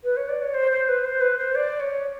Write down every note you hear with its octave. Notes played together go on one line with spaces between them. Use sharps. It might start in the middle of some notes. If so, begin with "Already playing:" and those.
B4
C#5
D5
C#5
C5
C5
B4
C5
B4
C5
D5
C#5